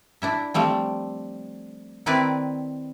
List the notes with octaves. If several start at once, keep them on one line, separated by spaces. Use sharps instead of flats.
D4 E4 E5
F3 G3 A3 C4
D#3 C4 E4 B4 D5